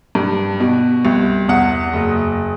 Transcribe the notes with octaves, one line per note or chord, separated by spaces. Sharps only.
G2
B2
C2
E2 F#5
F#1